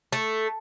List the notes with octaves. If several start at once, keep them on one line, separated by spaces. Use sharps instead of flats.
A3